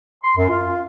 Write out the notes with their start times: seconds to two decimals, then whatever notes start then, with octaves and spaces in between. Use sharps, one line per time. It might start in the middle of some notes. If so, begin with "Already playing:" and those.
0.23 C6
0.36 F#2
0.49 F4